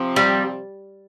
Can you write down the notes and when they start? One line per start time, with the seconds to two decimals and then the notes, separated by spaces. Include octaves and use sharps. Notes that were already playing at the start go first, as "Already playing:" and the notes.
Already playing: C3 F3 C4
0.16 G3